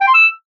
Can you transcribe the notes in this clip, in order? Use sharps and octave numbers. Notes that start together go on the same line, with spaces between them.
G5
C6
E6